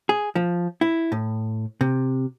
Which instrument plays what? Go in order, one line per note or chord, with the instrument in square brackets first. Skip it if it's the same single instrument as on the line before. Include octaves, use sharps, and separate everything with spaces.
[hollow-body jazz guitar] G#4
F3
E4
A2
C3